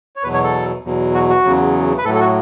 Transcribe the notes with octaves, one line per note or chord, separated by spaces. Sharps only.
C#5
E2 B2 F#3 B4
C#5
A4
E2 B2 F#3
F#4
F#4
E2 C#3 F#3
B4
A2 F#3 A4
A4
F#4